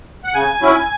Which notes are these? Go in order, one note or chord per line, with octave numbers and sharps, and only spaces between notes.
F#5
C#3 G#5
F#3 C#4 E4